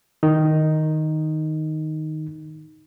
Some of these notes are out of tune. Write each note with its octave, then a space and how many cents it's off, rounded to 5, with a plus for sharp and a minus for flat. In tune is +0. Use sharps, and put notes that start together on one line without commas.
D#3 +0 D#4 +0